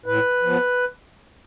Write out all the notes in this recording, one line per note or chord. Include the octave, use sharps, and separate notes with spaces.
A2 B4
F3 B3